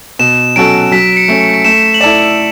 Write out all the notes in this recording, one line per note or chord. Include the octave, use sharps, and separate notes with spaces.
B2 E7
F#3 C#4 F#4 A4 D7
F#3 B6
C#7
A3 C#4
C#7
D7
A3 E7
F#7
E4 A4 D5 E7